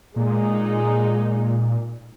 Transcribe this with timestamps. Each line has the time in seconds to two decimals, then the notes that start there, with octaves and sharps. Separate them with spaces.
0.16 A#2 G#3 D#4 G#4